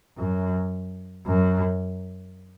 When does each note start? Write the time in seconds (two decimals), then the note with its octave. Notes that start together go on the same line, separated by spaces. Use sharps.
0.18 F#2
1.27 F#2